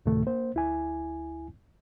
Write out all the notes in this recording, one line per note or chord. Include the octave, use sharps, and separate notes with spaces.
D2 A2 C3 D#3 A3
A#3 C5
D2 E4 G#5